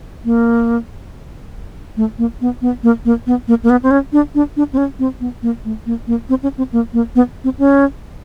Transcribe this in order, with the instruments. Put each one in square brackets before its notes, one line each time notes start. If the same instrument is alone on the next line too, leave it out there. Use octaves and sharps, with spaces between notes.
[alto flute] A#3
A3
A#3
B3
B3
A#3
A#3
B3
A#3
A#3
B3
C4
C#4
D4
D4
D4
C4
C#4
C4
B3
A#3
A3
A#3
A#3
C4
C#4
C4
A#3
A#3
B3
C4
C#4